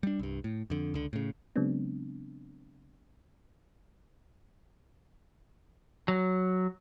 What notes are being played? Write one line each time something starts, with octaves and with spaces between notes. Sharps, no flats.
G3 D4
C2 G2
A2
F2 D3
C#2 D3
A2 C#3
C#3 F#3 G#3 B3 C4 D4
F#3